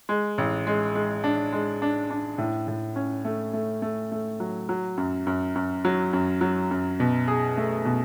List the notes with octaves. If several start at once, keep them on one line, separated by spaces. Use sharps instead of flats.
G#3
A1
G#3
G#3
D4
G#3
D4
D4
A2
A2
C#4
A3
A3
A3
A3
F#3
F#3
F#2
F#2
F#2
F#3
F#2
F#3
F#2
B2
G#4
A3
B2